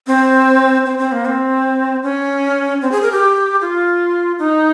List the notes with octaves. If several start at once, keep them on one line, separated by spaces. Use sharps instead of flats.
C4
C4
C4
A#3
C4
C#4
C4
G#4
A#4
G4
F4
D#4